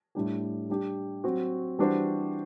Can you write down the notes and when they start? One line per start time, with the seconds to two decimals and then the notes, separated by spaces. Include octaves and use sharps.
0.15 A2 G3 D4 G4
0.70 G3 D4 G4
1.24 F#3 C4 F#4
1.79 E3 G3 D4 F#4 C5